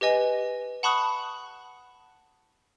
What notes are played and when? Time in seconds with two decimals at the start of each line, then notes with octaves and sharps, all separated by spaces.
0.01 G4 B4 D#5 G#5
0.83 F#5 A5 B5 C#6 D#6 F#6